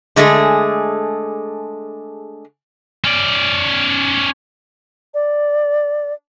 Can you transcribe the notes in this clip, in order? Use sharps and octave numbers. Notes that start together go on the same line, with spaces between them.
D3 G#3 A3 G#4
C#4 D5
D5